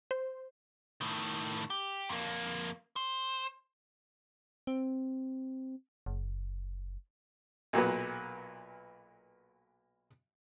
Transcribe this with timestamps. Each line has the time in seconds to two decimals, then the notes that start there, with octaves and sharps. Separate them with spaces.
0.11 C5
1.01 A2 D#3
1.70 G4
2.09 F2 A#3
2.96 C5
4.67 C4
6.06 F#1
7.73 B1 A#2 F#3 B3